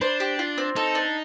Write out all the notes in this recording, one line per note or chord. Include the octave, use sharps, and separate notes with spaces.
D4 C5
G4
F4
C4
D#4 A4
D4